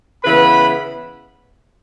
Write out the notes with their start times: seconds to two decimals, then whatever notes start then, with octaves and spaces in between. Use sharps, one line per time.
0.24 C#3 E3 B3 B4 B5